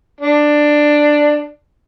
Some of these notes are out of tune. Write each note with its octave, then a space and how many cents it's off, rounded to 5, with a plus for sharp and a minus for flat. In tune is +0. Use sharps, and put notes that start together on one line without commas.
D4 +10